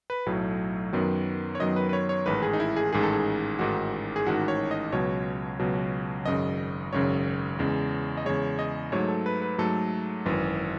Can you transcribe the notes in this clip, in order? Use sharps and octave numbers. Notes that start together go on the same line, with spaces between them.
B4
B1 A2 F#3 A3
F#2 D#3 F#3 B3
C#5
F#2 D#3 F#3 B3 D#5
B4
B4
C#5
C#5
A1 G#2 D#3 B4
G#4
D#4
E4
G#4
A1 G#2 D#3 G#4
A4
G#4
A1 G#2 D#3 F#4
G#4
A1 G#2 D#3 F#4
C#5
D#5
C#2 B2 F#3 C#5
C#2 B2 F#3
G#1 F#2 C#3 D#5
G#1 F#2 C#3 C#5
E2 C#3 G#3
D#5
E2 C#3 G#3 C#5
D#5
G#2 F#3 A3 C#5
A4
B4
B4
G#2 F#3 A3 A4
G#1 F#2 E3